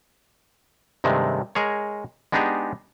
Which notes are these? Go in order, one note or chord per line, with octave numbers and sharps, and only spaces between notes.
G2 C3 D#3 G#3 A3
G#3 G#4 A#4 C#5
G#3 B3 D4 D#4 G4 G#4